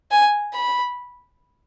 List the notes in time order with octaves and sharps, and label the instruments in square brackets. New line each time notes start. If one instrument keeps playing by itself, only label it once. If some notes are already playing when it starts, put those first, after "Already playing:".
[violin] G#5
B5